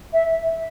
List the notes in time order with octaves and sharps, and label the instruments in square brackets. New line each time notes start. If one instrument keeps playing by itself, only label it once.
[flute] E5